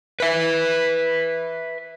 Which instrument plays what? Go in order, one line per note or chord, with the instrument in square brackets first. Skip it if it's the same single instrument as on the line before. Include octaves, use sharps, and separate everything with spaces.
[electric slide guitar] B4 E5